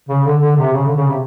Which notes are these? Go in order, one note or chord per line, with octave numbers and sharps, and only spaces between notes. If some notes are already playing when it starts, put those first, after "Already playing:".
C#3
D3
D3
C3
C#3
D3
C#3
C3